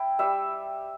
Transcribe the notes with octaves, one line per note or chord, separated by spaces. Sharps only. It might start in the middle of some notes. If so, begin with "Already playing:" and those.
Already playing: E4 G5
G3 E5